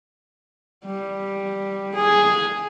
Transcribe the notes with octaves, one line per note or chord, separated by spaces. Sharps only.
G3
G#4